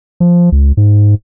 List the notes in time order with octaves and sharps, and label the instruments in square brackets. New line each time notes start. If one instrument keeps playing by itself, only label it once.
[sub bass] F3
C#2
G#2